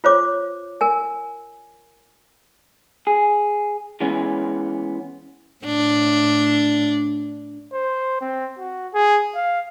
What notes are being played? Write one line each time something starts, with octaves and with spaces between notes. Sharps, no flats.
F4 C5 C#5 D6
A#4 G#5
G#4
E3 G#3 B3 C#4
A2 D4
C5
C4
F#4
G#4
F5